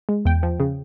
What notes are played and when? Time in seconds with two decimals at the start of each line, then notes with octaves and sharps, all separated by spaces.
0.09 G#3
0.25 E2 G5
0.43 F3
0.60 C#3